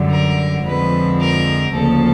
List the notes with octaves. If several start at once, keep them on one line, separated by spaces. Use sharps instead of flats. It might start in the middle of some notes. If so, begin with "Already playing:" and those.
Already playing: F#2 D3 G3
A#4
F2 D3 F3 G#3 C4 B4
A#4
D2 C#3 F3 A#3 A4